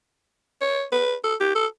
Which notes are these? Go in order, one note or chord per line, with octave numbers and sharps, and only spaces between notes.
C#5
B4
A4
G4
A4